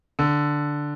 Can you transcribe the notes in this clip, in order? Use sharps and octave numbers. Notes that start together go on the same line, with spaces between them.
D3